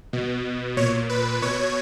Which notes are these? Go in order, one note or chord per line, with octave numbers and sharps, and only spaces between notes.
B2
A#2 C#5
B4
B2 C#5